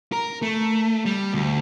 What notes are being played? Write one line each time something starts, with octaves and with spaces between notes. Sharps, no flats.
A#4
A3
G3
D2